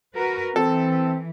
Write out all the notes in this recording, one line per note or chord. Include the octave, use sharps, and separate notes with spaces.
F#4 A#4 B4
E3 C4 A4